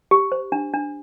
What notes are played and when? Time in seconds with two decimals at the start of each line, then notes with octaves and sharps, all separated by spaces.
0.11 G4
0.32 C5
0.52 D4
0.74 D4